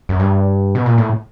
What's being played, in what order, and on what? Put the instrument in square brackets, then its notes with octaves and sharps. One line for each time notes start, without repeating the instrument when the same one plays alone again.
[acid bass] F#2
G2
B2
A#2
A2